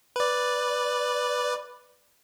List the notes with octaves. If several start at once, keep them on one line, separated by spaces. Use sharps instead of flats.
B4 D5